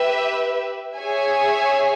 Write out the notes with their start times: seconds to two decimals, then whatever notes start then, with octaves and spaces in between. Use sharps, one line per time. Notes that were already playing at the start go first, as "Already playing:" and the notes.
Already playing: G4 B4 E5
0.97 G#4 C#5 E5 G#5